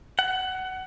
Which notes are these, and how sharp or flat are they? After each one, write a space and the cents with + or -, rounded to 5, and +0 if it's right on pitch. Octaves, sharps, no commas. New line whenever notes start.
F#5 +20